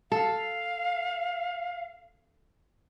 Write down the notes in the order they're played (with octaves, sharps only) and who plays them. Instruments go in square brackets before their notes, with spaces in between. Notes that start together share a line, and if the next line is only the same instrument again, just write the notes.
[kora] A4 [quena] F5